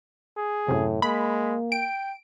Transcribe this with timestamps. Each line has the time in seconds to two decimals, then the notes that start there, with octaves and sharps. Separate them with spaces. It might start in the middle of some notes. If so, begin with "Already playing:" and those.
0.37 G#4
0.68 F#2 A2 C3
1.02 G#3 A#3 B5
1.72 G5 D7